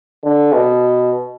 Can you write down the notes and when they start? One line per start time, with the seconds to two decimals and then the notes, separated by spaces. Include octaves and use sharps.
0.24 D3
0.53 B2